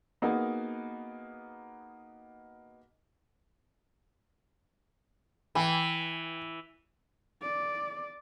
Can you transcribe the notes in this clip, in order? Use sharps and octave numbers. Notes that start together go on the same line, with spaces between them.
A#3 B3 D#4 F#4 G#4
E3 G5 G#5 B5
D5